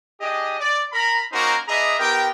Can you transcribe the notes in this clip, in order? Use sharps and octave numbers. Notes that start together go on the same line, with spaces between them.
D4 G4 G#4 D#5
D5
A#4 A#5 B5
A#3 C#4 D#4 F#4 A#4 C5
D4 G#4 B4 D#5 E5 A#5
B3 D#4 G4 A#4 G5